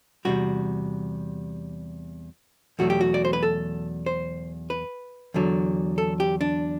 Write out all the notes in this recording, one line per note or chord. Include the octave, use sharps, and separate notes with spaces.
E2 C3 G3 F#4
E2 B2 F#3 A3 F#4
G4
F#4
D5
C5
B4
A4
C5
B4
E2 D3 F#3
A4
G4
D4